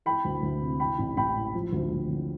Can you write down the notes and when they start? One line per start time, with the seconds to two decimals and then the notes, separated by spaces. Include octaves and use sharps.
0.05 E3 G5 B5
0.25 D2
0.43 D2
0.61 C3
0.80 E3 G5 B5
0.98 A1
1.17 A1 G5 B5
1.35 A2
1.55 F3
1.72 D2
1.91 D2
2.09 D3